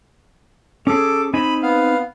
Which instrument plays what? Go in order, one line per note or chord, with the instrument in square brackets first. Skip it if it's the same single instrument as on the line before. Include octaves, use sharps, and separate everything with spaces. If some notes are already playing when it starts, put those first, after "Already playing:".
[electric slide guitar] C#4 G#4 [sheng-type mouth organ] A4 D6
[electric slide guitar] C4 D#4 G#5 [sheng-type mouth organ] B5
[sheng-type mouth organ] B3 F5